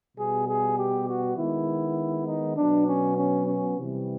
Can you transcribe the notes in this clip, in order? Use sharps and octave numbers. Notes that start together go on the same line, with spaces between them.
B2 G3 B3 G#4
G#4
G4
F#4
D#3 G#3 B3 E4
D#4
B2 F#3 B3 D4
C#4
C#4
C#4
C3 E3 G3